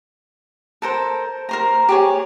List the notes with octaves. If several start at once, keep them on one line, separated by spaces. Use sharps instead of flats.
A4 A#4 C5
A#4 C5 A#5
G4 G#4 C#5